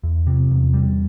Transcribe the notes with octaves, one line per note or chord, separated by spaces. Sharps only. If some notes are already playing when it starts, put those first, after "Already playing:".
E2
C3
E2
G3